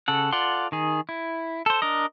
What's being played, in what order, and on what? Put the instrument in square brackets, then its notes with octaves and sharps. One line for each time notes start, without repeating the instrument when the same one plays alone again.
[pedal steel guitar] C#3 A4 F#5
F4 A4 D5 F#5 C6
D#3 G#4
E4
A4 C5
D4 A#4 D#5